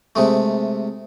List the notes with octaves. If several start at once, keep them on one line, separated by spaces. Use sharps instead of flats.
C3 G#3 A3